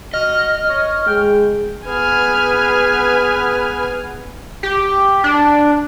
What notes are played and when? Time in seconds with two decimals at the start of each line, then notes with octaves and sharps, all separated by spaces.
0.14 F#4 D#5 F6
0.69 C#5
1.07 G#3 G5
1.87 B3 G#4 B4 G#5 F6
4.63 G4
5.24 D4